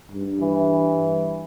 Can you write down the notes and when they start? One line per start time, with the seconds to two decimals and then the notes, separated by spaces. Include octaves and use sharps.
0.12 G2
0.42 E3